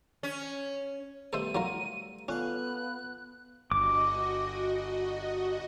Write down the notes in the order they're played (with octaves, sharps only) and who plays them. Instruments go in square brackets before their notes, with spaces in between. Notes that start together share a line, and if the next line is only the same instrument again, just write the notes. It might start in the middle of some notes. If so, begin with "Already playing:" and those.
[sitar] C#4
[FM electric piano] G3 A3 B3 [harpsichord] A4 C5 E5 [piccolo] D#7
[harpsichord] F#3 F4 A#4
[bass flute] B3 [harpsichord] C#4 [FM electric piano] F4 A4 F5 [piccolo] F#6
[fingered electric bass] G1 [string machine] F#4 D#5 [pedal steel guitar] D6